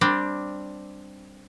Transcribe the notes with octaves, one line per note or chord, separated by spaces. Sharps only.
G3 C4 D4